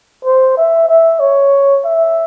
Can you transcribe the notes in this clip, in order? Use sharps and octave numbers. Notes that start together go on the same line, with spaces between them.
C5
E5
E5
C#5
E5